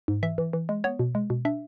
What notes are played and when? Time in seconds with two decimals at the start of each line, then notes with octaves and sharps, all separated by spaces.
0.08 G#2
0.23 E3 E5
0.38 E3
0.53 E3
0.69 G#3
0.84 B3 C#5
0.99 B2
1.15 G#3
1.30 B2
1.45 D4 E5